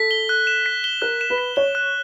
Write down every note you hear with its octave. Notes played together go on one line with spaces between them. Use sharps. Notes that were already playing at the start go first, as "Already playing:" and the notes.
Already playing: A4 B6
G7
F#6
E7
B6
G7
A#4 F#6
E7
B4
B6
C#5 G7
F#6